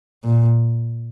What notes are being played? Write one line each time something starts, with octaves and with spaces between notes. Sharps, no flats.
A#2